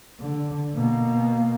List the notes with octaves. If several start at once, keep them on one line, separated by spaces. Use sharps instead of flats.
D3
B2 A#3